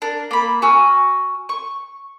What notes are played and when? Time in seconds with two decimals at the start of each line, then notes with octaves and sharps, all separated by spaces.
0.02 D4 A#4
0.31 A#3 B5
0.62 F#4 G#5 E6 F6
1.49 C#6